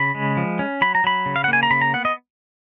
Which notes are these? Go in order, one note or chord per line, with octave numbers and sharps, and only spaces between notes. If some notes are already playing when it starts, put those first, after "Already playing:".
Already playing: C#3 B5
G#3
F3
C#4
F#3 B5
A#5
F#3 B5
C#3
F5
F#5
A#3 G#5
A#5
C#3 B5
A#5
B3 F#5
D#5